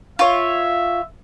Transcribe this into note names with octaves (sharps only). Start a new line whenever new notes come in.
F4 C#5 E5